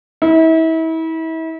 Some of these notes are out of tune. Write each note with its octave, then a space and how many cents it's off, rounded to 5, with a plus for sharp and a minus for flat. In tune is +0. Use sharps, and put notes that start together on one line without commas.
E4 -35